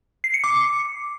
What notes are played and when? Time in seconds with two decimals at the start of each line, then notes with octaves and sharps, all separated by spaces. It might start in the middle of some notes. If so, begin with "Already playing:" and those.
0.24 C7
0.34 C#7
0.44 D6